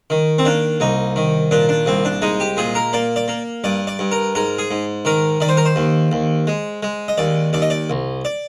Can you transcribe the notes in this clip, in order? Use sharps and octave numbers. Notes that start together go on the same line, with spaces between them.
D#3
C4
A#3 D4
C2 D#4
D#3
A#2 D4
D4
C2 C4
D4
G#3 D#4
G4
A#2 G#4
A#4
A#3 D5
D5
A#3
G2 D5
D5
G2
A#4
G#2 A#4
G#4
G#2
D#3 A#4
D#3 D5
C5
A#4
C5
D#2
D#2
G#3
G#3
D#5
D#2 D5
D#2 D5
D#5
D5
C2
D5